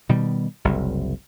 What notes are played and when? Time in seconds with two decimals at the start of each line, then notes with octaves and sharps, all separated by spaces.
0.09 B2 D#3 G3
0.65 F#1 C2